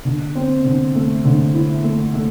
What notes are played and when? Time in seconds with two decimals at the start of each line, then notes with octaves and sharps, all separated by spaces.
0.05 D3
0.35 C4
0.64 D3
0.95 A3
1.25 D3
1.54 E4
1.84 A3
2.14 A3